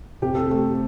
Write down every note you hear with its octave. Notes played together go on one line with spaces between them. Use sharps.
C3 G4
A4
A3 G4